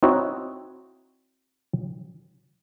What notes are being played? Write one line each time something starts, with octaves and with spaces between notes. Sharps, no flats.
C4 D#4 E4 F#4 C#5